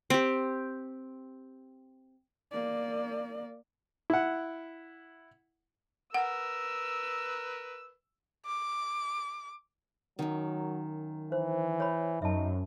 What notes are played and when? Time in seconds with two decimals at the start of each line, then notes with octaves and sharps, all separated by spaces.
0.10 C4 G4
2.52 A#3 D5
4.10 E4 F#5
6.14 A#4 B4 F#5 E6
8.46 D6
10.19 F#2 D#3 F#3
11.32 E3 C5
11.80 C#5 B5
12.22 F#2 D#4 E5 A5